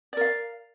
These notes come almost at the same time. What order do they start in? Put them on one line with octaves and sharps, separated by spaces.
D5 A#4 F5